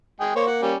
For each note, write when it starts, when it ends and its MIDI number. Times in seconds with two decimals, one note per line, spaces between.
0.20 0.32 56
0.20 0.32 68
0.20 0.32 79
0.36 0.71 58
0.36 0.46 72
0.36 0.46 73
0.36 0.46 85
0.47 0.58 78
0.62 0.75 55
0.62 0.75 61